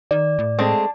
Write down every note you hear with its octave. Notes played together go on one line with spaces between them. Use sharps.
D#3 D5
A2
G#3 A3 C4 D4